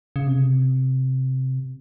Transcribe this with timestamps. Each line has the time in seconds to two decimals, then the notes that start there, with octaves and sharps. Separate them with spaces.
0.16 C#3
0.27 C3